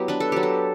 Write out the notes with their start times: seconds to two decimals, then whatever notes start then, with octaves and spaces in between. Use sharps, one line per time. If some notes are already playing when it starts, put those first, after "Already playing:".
Already playing: F#3 B3 E4 G4
0.08 D4 B4
0.20 A4
0.32 F#3 G4
0.43 A4